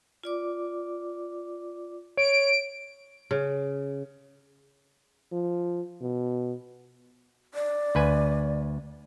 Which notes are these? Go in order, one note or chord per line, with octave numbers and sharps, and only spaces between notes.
F4 D5 D6
C#5 D7
C#3
F3
B2
D5
D2 B4 G#5